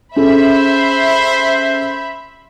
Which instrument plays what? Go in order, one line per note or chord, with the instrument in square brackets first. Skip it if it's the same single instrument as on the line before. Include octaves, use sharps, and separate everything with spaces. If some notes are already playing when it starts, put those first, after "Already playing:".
[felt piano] C#4 G#4 A4 [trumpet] C5 [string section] E5 B5